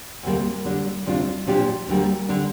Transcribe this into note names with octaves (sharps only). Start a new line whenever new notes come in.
D2 C3 G3 A#3
D3 G3 D4
D2 C3 G3 D4 F4
A#2 F3 D4 G4
D2 D3 G3 A#3
D3 G3 D4